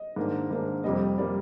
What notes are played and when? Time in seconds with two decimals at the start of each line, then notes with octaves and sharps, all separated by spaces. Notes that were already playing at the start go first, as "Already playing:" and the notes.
Already playing: D#5
0.16 G#2 D#3 A#3 D4
0.51 G#2 D#3 A#3 D4
0.84 F2 C3 G3 A#3 D#5
1.18 C3 G3 A#3 D5